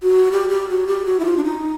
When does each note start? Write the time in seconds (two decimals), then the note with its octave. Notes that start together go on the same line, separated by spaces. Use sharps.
0.03 F#4
0.32 G4
0.49 G4
0.69 F#4
0.87 G4
1.06 F#4
1.20 E4
1.25 F4
1.37 D4
1.44 D#4